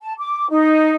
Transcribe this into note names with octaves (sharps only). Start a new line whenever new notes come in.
A5
D6
D#4